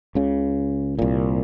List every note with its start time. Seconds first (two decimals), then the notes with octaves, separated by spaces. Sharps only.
0.15 C#2 C#3
0.99 C2 A#2